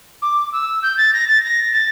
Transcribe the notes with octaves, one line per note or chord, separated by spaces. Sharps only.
D6
E6
G6
A6
A#6
A6
A#6
A6